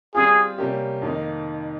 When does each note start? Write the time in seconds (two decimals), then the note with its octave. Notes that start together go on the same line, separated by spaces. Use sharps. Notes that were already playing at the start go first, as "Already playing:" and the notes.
0.14 G3 C4 F4 G#4
0.58 C3 G3 A#3 C#4 G4
1.02 F2 D#3 A#3 D#4